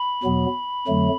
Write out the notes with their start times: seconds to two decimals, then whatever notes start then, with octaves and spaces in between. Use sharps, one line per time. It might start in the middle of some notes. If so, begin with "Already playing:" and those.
Already playing: B5
0.23 E2 B2 F#3 B3
0.87 F2 D3 F#3 A3